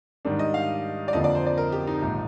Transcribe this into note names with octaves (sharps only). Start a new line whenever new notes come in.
G#2 D#3 G3 D4
D#5
F5
D5
F2 D3 F3 A#3 D#5
D5
C5
D5
A#4
G4
D#4
A#1 G#2 D#3 A#3